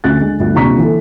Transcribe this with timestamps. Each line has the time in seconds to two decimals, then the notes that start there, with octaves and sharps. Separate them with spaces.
0.04 D2 C#4 F#6 A6
0.21 D3 G#3
0.39 G1 D2
0.54 D#1 C3 D4 A#5 C#6 B6
0.78 E3 A4